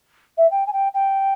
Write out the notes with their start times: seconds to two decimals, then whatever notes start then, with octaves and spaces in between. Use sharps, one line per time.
0.37 E5
0.50 G5
0.67 G#5
0.72 G5
0.94 G5